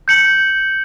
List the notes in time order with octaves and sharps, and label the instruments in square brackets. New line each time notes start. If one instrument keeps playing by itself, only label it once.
[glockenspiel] G6 C#7 F#7